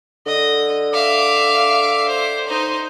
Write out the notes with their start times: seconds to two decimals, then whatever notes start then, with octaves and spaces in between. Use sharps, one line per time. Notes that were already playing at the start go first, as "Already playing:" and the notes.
0.27 D3 D#5
0.93 E5 F5 D6
2.08 C5
2.48 D#4 C5